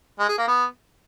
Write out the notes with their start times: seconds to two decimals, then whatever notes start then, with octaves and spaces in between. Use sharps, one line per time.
0.19 G#3
0.29 G#4
0.38 A#3
0.47 B3